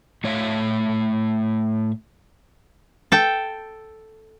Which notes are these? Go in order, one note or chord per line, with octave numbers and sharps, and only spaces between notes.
A2 A3 C#5 E5 F5
A4 G5